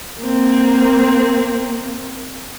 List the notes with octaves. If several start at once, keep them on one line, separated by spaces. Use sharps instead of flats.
A#3 C4